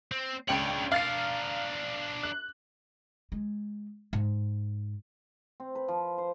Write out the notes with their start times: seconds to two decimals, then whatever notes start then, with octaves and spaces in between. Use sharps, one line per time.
0.12 C4
0.48 C#2 D4 C#5 G5 F#7
0.92 D4 A#4 F5 A6 C7
2.23 F#6
3.32 G#3
4.13 G#2
5.60 C4
5.75 B4
5.88 F3
6.18 C5